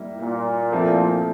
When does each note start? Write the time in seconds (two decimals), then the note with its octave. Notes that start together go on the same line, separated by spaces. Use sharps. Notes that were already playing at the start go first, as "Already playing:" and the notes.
Already playing: G3 A#3 E4
0.19 A#2
0.72 F3 A3 C4 E4